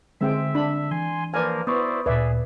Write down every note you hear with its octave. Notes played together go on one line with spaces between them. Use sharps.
D3 G#3 C4 E5 G5
D4 B5
E3 G#5 C6
F3 A#3 A#4 B4 D5 G#5
B3 E4 C5 D5 C#6 D#6
D2 A#2 G#4 B4 D5 E5